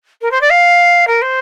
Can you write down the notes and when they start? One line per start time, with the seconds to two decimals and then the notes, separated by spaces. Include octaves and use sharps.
0.21 A#4
0.31 C5
0.41 D5
0.50 F5
1.07 A#4
1.22 C5